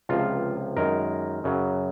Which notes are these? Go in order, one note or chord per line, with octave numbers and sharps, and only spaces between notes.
C#2 C3 F3 F4
F#2 D#3 G#3 A#4
F#2 C#3 F#3